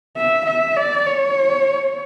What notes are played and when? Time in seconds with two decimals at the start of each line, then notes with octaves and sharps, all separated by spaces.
0.17 E5
0.46 E5
0.77 D5
1.07 C#5